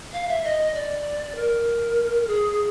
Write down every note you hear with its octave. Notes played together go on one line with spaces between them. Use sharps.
F5
E5
D#5
D5
A#4
G#4